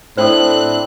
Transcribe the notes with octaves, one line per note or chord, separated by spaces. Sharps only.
A2 C4 D4 E4 A4 C5 F#6